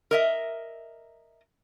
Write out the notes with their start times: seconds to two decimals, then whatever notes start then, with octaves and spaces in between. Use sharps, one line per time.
0.11 A#4 D#5 E5